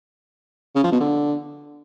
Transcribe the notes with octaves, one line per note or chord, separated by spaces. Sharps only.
C#3
F3
B2
D3